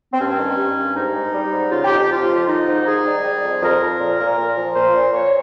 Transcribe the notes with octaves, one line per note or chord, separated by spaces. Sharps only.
C4
G2 C#4
D#3
G2
G2
G#2 D#4
G#2
G3
G#2
C#3 F4
G4
F2
G4
F2 F4
F3
D#3 D#4
G#2
D#3 G#4
G3
G3
F2
F2 A#4
F2
A#2
A#2
A#2
F3
A#2 C5
A#2
A#2 C#5